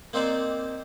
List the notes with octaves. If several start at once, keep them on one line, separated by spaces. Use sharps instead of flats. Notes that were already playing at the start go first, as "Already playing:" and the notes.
A#3 C4 D#4 C5 D5